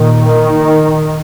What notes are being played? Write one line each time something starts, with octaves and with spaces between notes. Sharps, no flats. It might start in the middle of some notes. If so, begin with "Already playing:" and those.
Already playing: A#2 D#3